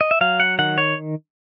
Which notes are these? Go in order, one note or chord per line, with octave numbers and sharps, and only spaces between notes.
D#5
E5
F#3 F5
F#5
D#3 F#5
C#5